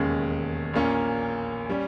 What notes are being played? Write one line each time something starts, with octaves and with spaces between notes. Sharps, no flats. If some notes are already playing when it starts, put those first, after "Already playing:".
Already playing: E1 D#2 C#3 G#3 C#4
A#1 A#2 A#3 C#4
G3 C#4